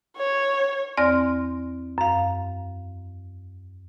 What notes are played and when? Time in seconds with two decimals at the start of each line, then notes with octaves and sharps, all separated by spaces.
0.17 C#5
0.97 E2 C4 D5 C6 F6 A#6
1.98 F#2 F5